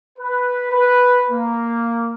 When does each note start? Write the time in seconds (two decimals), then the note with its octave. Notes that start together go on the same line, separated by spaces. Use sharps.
0.19 B4
0.71 B4
1.31 A#3